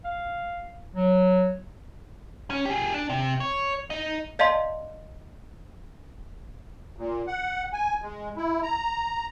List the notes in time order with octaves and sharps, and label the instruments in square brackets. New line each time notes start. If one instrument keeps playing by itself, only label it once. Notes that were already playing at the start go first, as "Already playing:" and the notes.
[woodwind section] F5
F#3
[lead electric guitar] C#4
G4 G#4
D4
C3
C#5
D#4 D#5
[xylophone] D5 D#5 F5 A5 C6
[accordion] A#2
F#5
G#5
G#3
E4
A#5